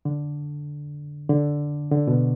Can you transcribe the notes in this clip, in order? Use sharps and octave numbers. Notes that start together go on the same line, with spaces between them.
D3
D3
D3
B2